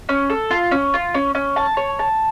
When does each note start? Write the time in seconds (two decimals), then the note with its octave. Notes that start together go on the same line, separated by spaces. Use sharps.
0.09 C#4
0.30 A4
0.50 F4
0.71 C#4
0.94 F4
1.14 C#4
1.35 C#4
1.56 A5
1.77 C#5
1.99 A5